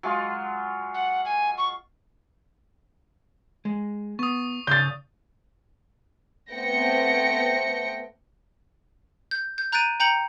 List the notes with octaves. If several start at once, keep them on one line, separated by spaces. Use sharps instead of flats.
F#3 G#3 F4
F#5
G#5
C#6
G#3
B3 C#6 D#6
C#3 D5 C6 G6 A6
A3 B3 C4 G5 A#6 C#7
G6
G6
A#5 F#6 G6 A6 D7 D#7
G5 A#5 G6 C#7 F#7